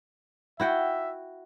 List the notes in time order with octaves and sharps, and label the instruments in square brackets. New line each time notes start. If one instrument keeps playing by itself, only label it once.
[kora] E4 F#4 G5 [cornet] E5